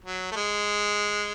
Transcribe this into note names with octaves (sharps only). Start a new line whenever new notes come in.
F#3
A3
G#3